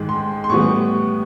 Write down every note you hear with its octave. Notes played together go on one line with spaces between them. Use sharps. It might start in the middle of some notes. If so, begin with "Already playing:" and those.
Already playing: G#2 D#3 G#3
C6
C6
A2 E3 G3 B3 C#6